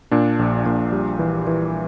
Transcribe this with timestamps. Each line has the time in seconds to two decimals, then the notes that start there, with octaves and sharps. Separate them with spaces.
0.11 A#2 D4
0.39 A#1
0.66 A#2
0.92 G3
1.19 E3
1.47 E3